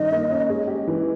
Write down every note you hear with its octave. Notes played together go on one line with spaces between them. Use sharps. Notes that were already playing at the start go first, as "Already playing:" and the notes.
Already playing: G2 D#3 C#4 D#5
A#3
C#4
G#3
G4
E3